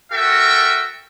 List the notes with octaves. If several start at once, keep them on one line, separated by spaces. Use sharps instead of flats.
F#4 A4 A#4 E5 G5